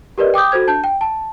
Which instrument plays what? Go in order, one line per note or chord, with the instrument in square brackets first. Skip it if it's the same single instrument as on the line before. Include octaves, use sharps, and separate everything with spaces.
[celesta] G4 A#4 B4 D5 D#5
G5 D6 D#6 G6
F#4 A4 C5 G#6
D4 A5 G6
G5
A5